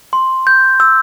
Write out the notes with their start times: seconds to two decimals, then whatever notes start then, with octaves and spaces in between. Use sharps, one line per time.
0.13 C6
0.47 G6
0.80 E6